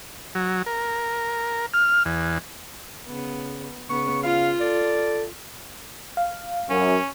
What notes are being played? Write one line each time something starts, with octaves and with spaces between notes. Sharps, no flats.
F#3
A#4
F6
E2
C#3 B3
C#3 B3 C#6
F4 F5
A4 D5
F5
F#2 C#4